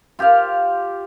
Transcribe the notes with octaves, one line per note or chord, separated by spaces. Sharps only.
F4 G4 C5 F5